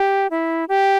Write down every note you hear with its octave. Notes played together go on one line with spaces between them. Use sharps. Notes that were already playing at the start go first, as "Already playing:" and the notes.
Already playing: G4
E4
G4